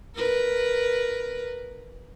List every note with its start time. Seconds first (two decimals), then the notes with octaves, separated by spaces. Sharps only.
0.15 A#4 B4